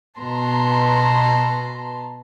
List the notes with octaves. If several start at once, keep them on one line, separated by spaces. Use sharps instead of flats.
B2 B4 A5 A#5 C6